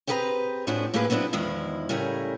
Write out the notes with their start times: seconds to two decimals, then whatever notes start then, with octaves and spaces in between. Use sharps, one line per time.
0.07 C4 G4 G#4 B4 F5 A#5
0.67 A2 F3 A3 D4 F#4 G#4
0.94 A2 A#3 E4 G4 G#4 B4
1.10 F#3 B3 C4 D4 E4
1.33 E2 D#3 F3 G#3 E4
1.89 A2 C#3 G3 A3 A#4 G#5